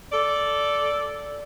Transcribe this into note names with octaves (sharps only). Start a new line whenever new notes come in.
A4 D5